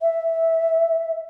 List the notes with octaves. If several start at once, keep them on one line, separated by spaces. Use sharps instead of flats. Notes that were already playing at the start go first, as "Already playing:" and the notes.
E5